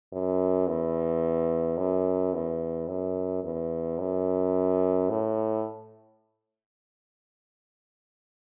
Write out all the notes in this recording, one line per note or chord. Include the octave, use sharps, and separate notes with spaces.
F#2
E2
F#2
E2
F#2
E2
F#2
A2